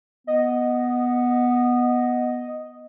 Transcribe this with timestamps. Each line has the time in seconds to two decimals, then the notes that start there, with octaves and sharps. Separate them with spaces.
0.27 B3 D#5